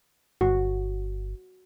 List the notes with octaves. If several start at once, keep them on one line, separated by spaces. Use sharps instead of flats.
G1 F#4